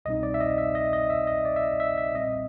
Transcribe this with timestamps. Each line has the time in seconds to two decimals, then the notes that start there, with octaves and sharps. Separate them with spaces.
0.05 C2 B2 G3 C4 D#4 D#5
0.23 D5
0.34 E5
0.41 D#5
0.58 E5
0.75 D#5
0.93 D#5
1.10 E5
1.27 D#5
1.45 D5
1.56 E5
1.63 D#5
1.80 E5
1.98 E5
2.15 B1 A#2 G3 C4 D#5